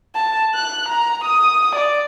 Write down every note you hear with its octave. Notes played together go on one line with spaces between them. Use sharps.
A5
F#6
A#5
D#6
D5